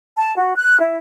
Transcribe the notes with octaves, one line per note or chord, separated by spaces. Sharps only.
A5
F#4
F#6
E4